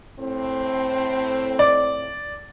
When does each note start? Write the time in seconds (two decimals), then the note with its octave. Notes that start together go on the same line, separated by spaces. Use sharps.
0.19 A2 C4
1.59 D5